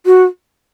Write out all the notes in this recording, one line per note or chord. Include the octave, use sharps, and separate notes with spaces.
F#4